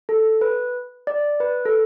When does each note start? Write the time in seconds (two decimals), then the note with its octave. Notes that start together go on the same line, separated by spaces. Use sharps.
0.09 A4
0.41 B4
1.07 D5
1.40 B4
1.65 A4